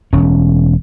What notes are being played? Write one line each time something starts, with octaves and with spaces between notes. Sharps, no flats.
E1 C#4